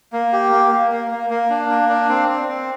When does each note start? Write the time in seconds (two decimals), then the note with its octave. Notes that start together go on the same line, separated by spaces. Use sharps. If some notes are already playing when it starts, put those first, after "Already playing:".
0.13 A#3
0.33 G4
0.52 A#3
0.72 A#3
0.92 A#3
1.11 A#3
1.30 A#3
1.50 D4
1.70 A#3
1.89 D4
2.09 C4
2.28 C4
2.48 C4